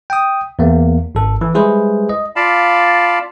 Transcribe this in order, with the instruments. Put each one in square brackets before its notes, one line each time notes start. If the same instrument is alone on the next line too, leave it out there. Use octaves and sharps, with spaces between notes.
[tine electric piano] G5 D#6
E2 A#3
G#1 A4
E3
G3 G#3 E4 G#4 B4 C5
D#5
[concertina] F4 D5 F5 A5 B5